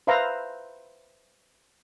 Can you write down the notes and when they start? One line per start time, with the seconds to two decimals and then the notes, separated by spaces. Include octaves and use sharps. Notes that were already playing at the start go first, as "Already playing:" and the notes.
0.07 B4 C5 E5 F5 A#5